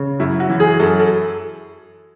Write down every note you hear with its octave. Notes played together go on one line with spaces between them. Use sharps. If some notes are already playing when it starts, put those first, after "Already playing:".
Already playing: C#3
F#2 E4
F#4
E3
G#4
F#2 A4
A4